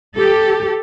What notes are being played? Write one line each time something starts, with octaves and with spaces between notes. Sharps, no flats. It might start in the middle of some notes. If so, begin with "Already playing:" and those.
G4 A4